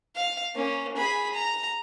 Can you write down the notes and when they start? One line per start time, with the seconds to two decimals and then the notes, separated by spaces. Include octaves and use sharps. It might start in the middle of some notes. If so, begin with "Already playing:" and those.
0.16 F5
0.55 A#3 C#4
0.97 G#4 B5
1.34 A#5